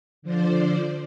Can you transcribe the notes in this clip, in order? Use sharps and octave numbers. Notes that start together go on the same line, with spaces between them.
D3 F3 C5 D5